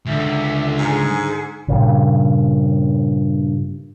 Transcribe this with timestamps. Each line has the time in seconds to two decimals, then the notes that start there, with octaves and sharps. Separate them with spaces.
0.06 C#2 D3 E5
0.78 G#2 G#4
1.68 G2 A#2 C#3